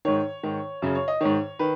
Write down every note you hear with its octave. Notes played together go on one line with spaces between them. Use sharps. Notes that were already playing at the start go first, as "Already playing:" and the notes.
G#2 D#3 C#5
G#2 D#3
F#2 C#3
C#5
D#5
G#2 D#3 C#5
D#3 B4